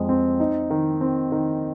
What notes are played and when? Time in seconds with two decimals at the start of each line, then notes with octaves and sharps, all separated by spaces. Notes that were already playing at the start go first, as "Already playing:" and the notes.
Already playing: F2 G#3
0.09 C4
0.40 D#4
0.70 D#3
1.01 C4
1.32 D#3